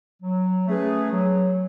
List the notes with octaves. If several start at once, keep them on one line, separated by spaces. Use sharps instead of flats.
F#3
A3 C#4 G#4 B4
F#3